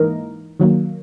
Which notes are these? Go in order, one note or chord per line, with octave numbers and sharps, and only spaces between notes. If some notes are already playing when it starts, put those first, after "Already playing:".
Already playing: G#2 E3 A#3 D#4 A#4
D#3 F#3 A#3